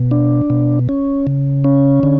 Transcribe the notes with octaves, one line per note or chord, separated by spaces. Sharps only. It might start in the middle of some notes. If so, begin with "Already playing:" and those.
Already playing: B2
D4
B2
C#4
C#3
C#4
D3